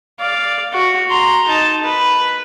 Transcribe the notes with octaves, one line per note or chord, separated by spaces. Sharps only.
D5 F5
F#4
A#5 C6
D#4 A5
B4